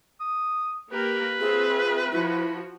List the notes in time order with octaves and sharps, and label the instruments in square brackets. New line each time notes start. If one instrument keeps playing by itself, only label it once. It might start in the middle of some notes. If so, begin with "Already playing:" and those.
[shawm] D#6
[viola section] A#3 G4 A#4 [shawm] B4
[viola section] C4 F4 E5 [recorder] G#4
[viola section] F3 F#4 [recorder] E4